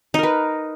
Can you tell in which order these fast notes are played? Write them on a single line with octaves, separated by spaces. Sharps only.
D#4 A#4 B4